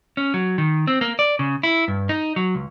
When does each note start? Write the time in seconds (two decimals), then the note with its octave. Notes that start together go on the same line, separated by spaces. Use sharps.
0.17 C#4
0.34 F#3
0.58 D#3
0.87 C4
1.01 A#3
1.19 D5
1.39 C#3
1.63 E4
1.88 G2
2.09 D#4
2.36 F#3
2.55 C#2